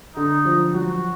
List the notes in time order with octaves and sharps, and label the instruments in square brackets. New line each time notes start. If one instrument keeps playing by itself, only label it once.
[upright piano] D3 [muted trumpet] D#4
[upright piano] F3
[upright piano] F#3 [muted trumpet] F#4